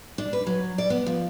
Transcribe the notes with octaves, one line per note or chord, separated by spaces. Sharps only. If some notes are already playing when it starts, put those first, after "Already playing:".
D4
B4
F#3
D5
B3
F3